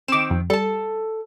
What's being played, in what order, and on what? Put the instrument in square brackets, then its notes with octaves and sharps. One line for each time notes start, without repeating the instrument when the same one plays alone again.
[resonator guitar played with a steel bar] D#3 C4 [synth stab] D6 E7
[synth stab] F2
[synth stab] G3 [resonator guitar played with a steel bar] A4 A5